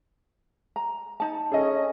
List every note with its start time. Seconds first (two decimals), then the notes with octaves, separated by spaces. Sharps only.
0.76 A#5
1.20 D#4 A5
1.52 C#4 G#4 A4 D#5